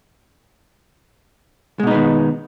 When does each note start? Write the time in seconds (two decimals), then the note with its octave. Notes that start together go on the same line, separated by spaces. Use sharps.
1.80 G#3
1.83 B2
1.87 D#4
1.91 B3
1.94 D#3